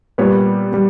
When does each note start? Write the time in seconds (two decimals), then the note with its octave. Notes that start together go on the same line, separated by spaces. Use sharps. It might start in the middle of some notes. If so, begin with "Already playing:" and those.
0.18 A#2 G3 B3 B4 C#5
0.72 G3 B3